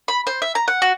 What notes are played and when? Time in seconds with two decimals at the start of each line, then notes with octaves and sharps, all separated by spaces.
0.08 B5
0.27 C5
0.42 E5
0.55 A#5
0.68 F#5
0.82 F#4